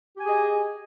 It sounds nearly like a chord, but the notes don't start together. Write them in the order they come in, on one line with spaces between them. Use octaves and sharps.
G4 G#5 G#4 D#5